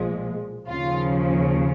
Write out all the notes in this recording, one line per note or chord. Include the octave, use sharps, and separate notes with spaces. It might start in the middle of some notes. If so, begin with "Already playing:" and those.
Already playing: B1 A#2 F3 G#3
D#2 C#3 F3 F4